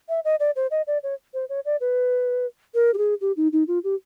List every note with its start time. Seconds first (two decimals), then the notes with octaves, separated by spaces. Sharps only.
0.09 E5
0.25 D#5
0.40 D5
0.56 C5
0.71 D#5
0.87 D5
1.03 C#5
1.34 C5
1.49 C#5
1.65 D5
1.80 B4
2.74 A#4
2.94 G4
2.98 G#4
3.21 G4
3.37 D#4
3.52 D#4
3.68 F4
3.84 G4